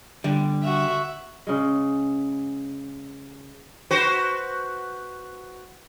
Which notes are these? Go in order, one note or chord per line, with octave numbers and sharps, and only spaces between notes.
D3 G3
F#4 E5
C#3 G#3
F#4 B4 C5